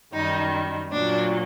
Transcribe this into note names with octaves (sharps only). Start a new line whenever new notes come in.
F#2 D#3 G3 D#4
A#2 F#3 D4